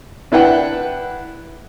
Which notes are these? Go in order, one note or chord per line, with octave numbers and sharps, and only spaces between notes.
D4 E4 B4 F#5 G5